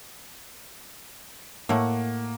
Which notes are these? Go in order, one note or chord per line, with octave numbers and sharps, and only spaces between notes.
A2 A3 A#3 F#5